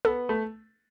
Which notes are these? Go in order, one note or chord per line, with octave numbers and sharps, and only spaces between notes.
B3 A4
A3